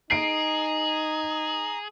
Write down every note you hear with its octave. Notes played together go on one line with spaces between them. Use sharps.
D#4 G#4 A#5 D#6 C7 D7